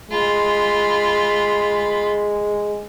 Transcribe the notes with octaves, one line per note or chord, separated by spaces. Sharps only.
G#3 F4 B5